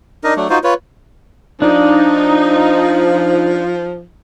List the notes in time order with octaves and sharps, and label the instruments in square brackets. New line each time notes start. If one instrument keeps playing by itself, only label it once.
[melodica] D4 D#4 A#4 D#5
F#3 A3 D4
D#4 F4 F#4 C5
F4 B4 C#5
[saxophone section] F3 [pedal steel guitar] D4 D5 [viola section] D#4